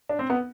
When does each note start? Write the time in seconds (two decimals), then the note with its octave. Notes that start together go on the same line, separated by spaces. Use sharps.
0.09 D4
0.19 C4
0.30 B3